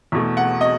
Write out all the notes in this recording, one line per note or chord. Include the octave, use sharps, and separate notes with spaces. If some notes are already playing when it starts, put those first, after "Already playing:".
E2 B2 A3
F#5
D#5